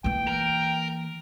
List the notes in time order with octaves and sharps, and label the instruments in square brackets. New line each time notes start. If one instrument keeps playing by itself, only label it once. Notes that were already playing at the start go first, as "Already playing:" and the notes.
[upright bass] E3 A#3 [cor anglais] G5
[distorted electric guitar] A#4